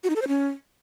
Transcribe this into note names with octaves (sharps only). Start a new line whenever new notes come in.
F#4
D#4
A4
C5
C#4